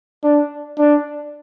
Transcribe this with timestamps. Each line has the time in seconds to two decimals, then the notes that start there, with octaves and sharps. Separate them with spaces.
0.24 D4
0.79 D4